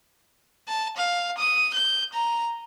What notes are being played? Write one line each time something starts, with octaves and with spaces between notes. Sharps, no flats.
A5
F5
D#6
G6
A#5